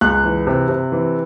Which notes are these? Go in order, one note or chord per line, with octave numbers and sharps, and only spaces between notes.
C#2 F#6
E3
C3
C3
E3